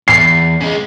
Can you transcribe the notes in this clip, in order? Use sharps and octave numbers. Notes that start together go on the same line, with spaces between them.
E2 C7
C#3 G#3